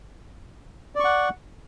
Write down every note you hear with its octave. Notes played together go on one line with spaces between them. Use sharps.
D5 F#5 C#6